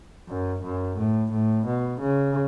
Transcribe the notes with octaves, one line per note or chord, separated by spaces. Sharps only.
F#2
F#2
A2
A2
B2
C#3